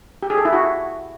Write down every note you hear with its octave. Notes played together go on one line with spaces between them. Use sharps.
G4
G#4
A4
E4
F#4